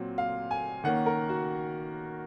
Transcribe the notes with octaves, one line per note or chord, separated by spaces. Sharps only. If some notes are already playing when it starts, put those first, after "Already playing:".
Already playing: A#2 F#3 C4
F5
G#5
D#3 A#3 C#4 F#5
A#4
F#4